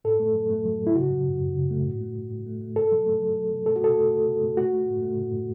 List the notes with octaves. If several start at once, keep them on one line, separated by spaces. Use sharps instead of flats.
A2 A4
A3
F#3
A3
F#3
A2
E4
C#3 F#4
F#3
F#2
F#2
C#3
A3
A2
A3
A2
A2
A3
A3
B2 A4
F#3
A3
F#3
F#3
B2
A3 A4
F#4
B2 A4
A3
A3
B2
A3
A3 F#4
A3
A2
A3
A2
A2